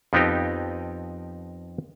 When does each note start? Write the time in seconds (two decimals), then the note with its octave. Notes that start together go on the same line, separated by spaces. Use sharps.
0.13 F2 F3 B3 C4 D#4 G4